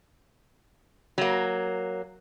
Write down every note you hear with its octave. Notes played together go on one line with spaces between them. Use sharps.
F#3 A#3